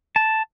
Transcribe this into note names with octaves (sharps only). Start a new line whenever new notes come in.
A5